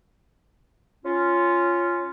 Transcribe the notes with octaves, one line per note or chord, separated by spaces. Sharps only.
C#4 F4